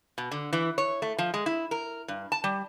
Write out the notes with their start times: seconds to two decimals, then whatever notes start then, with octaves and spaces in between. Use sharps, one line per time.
0.18 B2
0.31 D3
0.53 E3
0.78 C#5
1.02 A3
1.18 F3
1.34 G#3
1.46 E4
1.71 A#4
2.08 G2
2.32 A5
2.44 G3